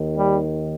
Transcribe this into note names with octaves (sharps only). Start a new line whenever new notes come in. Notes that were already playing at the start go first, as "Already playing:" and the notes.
Already playing: D#2 D#3
G3